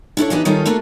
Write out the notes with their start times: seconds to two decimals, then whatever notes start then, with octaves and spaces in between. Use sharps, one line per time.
0.17 D4 E4 A4 C#5
0.30 E3 B3 D4 D#4 G4 B4
0.45 D#3 G3 C#4 D#4 F4 A4
0.66 A3 A#3 F4 F#4 A4